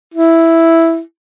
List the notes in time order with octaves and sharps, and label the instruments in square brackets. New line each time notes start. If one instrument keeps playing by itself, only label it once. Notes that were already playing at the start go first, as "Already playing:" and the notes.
[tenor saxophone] E4